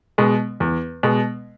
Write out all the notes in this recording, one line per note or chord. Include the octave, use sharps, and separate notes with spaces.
B2 G#3
E2
B2 G#3